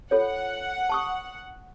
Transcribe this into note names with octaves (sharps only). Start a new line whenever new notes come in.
F4 A4 C#5 F#5
A5 C#6 D#6